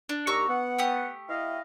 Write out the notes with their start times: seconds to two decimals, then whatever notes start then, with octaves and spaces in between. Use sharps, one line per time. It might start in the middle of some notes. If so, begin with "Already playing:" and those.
0.09 D4
0.27 D#2 G4 A#5 C#6 E6
0.49 B3 F#5
0.79 A3 G4 D#6
1.29 E4 D#5 F5